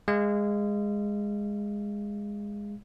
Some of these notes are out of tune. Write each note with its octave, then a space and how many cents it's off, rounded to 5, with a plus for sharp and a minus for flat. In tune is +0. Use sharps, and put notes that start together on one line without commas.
G#3 -15 F5 -30